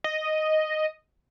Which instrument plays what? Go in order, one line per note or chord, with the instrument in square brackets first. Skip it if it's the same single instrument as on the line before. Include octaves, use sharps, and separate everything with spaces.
[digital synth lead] D#5